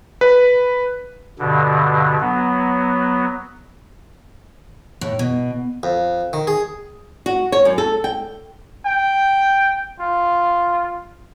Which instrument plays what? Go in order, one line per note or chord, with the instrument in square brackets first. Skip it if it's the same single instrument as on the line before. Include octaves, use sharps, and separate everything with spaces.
[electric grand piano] B4
[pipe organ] G2 B2 D3
F#3 B3
[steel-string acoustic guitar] A2
B2
[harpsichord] F2
D#3
G#4
[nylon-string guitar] F#4
C#5
F#2
A4
G5
[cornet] G5
F4